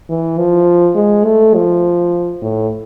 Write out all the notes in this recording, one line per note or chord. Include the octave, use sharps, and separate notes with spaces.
E3
F3
G#3
A3
F3
A2